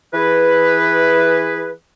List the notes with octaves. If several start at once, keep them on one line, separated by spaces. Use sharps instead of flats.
E3 G#4 B4